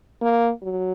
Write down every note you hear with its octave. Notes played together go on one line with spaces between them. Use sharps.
A#3
F#3